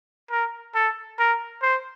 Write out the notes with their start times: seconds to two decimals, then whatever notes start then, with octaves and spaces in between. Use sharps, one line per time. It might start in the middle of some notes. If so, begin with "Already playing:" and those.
0.31 A#4
0.75 A4
1.19 A#4
1.62 C5